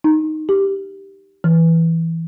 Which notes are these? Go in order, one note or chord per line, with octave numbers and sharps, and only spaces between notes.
D#4
G4
E3